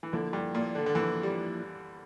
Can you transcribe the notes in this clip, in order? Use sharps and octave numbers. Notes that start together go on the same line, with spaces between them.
E3
D3 F3 A#3 E4
G2
A#2
D3
D3
E3 F3 A#3 E4
G3